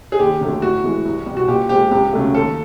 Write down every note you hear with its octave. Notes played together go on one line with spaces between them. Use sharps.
G#4
D#2 G4
D3 F#3 A3
A2 F#4
E3 G#3
C2
B2 G3
F#4
A#2 G4
F3 G#3 G4
C#2 G4
C#3 F#3 A3
D#2 A4